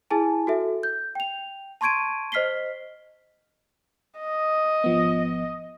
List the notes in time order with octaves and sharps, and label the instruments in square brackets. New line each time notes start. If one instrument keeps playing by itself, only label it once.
[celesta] E4 G#4 G#5 A5
F#4 A4 E5
G6
G5 F7
A5 C6 C#6 G#6 D7 D#7
C5 D#5 F6 B6 C7 G7
[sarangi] D#5
[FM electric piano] G#1 F3 B3